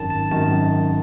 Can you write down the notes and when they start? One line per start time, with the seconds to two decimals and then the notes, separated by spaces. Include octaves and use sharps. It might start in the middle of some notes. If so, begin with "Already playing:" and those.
Already playing: G#1 F#2 D#3 A5
0.10 A5
0.31 G#1 F#2 D#3 A5